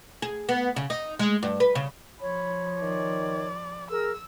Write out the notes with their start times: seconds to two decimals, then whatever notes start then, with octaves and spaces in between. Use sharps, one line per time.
0.22 G#4
0.49 B3
0.76 C#3
0.90 D#4
1.19 G#3
1.43 G2
1.60 B4
1.75 C#3
2.21 F3 C#5 B5
2.82 D#3 D5
3.91 G#4 A#4 E6